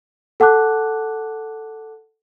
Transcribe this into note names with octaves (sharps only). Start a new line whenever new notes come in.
A4 F#5 A5 D6 F#6